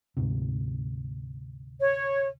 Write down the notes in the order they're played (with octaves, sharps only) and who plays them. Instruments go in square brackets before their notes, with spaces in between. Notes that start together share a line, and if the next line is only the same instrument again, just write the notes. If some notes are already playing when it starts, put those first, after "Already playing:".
[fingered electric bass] D2 G#2 C3
[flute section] C#5